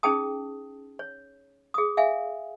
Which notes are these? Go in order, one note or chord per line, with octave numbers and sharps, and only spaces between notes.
C#4 D#4 G#4 G5 A5 D#6
C#5
G#4 D#6
E5 F5 G#5